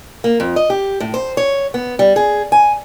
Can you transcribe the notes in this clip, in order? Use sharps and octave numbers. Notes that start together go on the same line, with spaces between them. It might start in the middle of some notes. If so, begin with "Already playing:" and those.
A#3
F2
D#5
G4
A2
C5
C#5
B3
G3
G#4
G#5